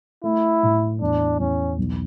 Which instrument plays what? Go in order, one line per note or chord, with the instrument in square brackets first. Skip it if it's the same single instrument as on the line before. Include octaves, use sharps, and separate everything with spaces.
[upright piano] A3 [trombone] E4
[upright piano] A2
[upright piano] E2 [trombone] D4
[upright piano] E2 [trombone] C#4
[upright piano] B1